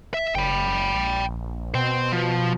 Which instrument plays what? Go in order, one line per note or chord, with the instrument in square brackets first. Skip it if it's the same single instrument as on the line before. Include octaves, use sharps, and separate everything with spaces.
[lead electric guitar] E5
[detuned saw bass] F#1 [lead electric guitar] G5 B5
[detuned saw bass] A#1
[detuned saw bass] B2 [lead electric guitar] C5 G5
[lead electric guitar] F3